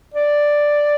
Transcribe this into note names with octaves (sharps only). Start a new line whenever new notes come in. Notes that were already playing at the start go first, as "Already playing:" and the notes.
D5